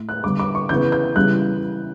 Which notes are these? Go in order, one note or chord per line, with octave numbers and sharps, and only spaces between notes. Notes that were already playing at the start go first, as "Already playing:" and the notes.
Already playing: A2
F#6
D3 G3 B3 D6
D6
C#6
C#3 E3 B3 G6
G6
C#3 E3 G3 B3 F#6